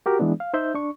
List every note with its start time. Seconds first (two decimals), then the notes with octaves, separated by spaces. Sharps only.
0.06 F#4 G4 A#4
0.19 E3 G#3 B3 D4
0.40 F5
0.54 D#4 C5 E5 G6
0.75 D4 C#6